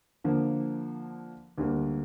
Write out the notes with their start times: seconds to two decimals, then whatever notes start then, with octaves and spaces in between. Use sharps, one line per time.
0.24 D3 F3 A#3
1.58 D2 D3 G3 A#3